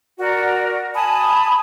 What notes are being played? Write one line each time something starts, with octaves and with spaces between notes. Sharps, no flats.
F#4 A#4 D5
G#5 A5 B5 D#6